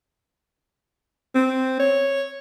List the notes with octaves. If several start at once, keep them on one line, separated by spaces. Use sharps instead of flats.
C4
C#5